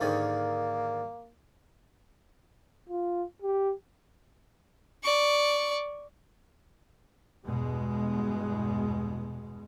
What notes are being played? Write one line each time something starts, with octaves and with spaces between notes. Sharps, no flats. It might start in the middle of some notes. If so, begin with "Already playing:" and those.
G#2 D3 D#3 A#3
F4
G4
D5 C#6
E2 G2 B2 G#3